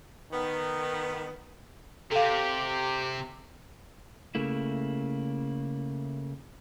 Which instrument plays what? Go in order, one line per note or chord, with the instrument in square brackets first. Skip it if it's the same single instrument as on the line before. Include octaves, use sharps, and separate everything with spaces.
[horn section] D#3 B3
[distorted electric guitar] C3 [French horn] G4 [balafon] A4 F5
[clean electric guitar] C#3 A3 A#3 E4